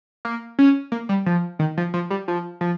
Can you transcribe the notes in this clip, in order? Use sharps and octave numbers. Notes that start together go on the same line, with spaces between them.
A#3
C#4
A#3
G3
F3
D#3
F3
F3
G3
F3
F3